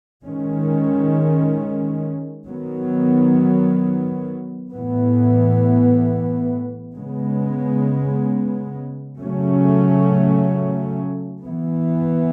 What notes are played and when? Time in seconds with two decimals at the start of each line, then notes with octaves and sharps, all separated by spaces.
0.24 D#3 G#3 C#4
2.47 D#3 F#3 B3
4.71 A2 E3 B3
6.95 C#3 G#3 B3
9.18 C#3 F#3 A3 C#4
11.43 E3 B3